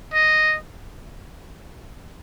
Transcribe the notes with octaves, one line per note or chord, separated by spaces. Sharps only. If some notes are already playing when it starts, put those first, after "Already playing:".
D#5